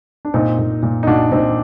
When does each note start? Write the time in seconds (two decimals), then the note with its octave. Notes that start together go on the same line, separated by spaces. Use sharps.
0.25 D4
0.34 A#2 C4 D#4
0.59 A#2
0.83 A#2
1.03 D#4
1.07 A#2 D4 F#4
1.32 A#2 C4 D#4